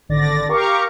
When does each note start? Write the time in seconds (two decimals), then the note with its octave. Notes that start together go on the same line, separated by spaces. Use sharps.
0.09 G#1 D3 D5 A6 A#6
0.49 G4 A#4 F5 A#5 C#6 D6